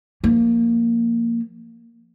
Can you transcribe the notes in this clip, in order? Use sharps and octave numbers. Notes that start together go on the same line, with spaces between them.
F3 A#3